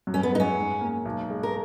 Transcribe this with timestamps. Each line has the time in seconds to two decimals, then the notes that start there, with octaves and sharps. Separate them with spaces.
0.07 F#2
0.14 C#4
0.23 B3
0.32 G#3 D#4
0.40 C#4
0.56 G#2
0.81 A#3
1.05 B1
1.30 G#3
1.43 A#4